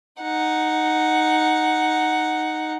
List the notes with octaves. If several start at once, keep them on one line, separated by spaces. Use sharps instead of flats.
D#4 F#5